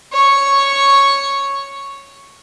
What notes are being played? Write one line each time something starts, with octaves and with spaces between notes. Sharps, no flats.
C#5 C#6